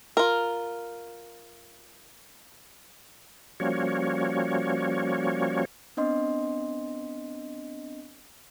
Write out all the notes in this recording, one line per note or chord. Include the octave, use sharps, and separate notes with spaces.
F4 A#4
F3 G3 A#3 C#4 F#4 C#5
B3 C4 D4 D#5 C6